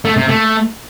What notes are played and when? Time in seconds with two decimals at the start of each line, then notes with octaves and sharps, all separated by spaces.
0.05 A3
0.17 C3
0.28 A3